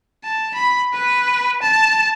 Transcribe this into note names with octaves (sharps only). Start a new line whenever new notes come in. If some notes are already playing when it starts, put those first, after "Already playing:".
A5
B5
B4
A5